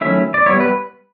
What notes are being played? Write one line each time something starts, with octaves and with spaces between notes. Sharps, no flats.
D#3 F#3 A3 C#4 E4 E5
D5
G3 B3 E4 C#5
B4